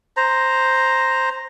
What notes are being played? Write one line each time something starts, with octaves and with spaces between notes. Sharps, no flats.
C5 A#5